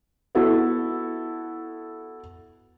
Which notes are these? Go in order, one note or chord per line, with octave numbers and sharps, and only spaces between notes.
B3 E4 F#4 A4